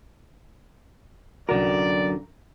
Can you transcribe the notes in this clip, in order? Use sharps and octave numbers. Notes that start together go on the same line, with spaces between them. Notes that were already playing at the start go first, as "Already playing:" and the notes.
C2 F#2 D3 F#4 A#4 D5